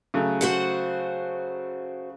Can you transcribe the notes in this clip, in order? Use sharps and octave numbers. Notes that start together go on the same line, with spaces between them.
C#3 F#3 A3
F#4 C5 F#5